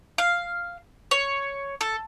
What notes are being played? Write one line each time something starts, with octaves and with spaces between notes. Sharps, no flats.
F5
C#5
A4